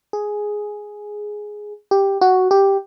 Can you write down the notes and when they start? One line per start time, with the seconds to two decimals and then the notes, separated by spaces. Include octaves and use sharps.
0.13 G#4
1.91 G4
2.21 F#4
2.51 G4